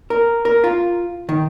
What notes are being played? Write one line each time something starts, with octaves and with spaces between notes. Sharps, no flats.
A#4
A#4
F4
D#3